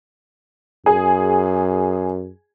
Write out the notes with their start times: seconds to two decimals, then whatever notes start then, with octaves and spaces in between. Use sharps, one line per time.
0.86 F#2 G#4